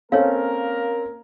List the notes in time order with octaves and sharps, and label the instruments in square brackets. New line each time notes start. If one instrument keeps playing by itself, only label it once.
[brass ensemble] A#3 A#4 [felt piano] C4 C#4 A4 [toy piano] C#5 F5